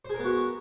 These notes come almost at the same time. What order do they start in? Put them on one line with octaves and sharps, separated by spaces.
C5 G#4 A#4 B3 F#4